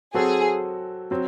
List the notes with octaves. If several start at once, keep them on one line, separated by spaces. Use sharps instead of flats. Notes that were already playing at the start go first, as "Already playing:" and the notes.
F#3 C4 F#4 G#4 A4
F#3 C4